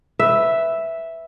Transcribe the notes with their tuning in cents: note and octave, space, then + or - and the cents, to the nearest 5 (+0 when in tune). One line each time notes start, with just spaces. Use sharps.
B4 +5 E5 +0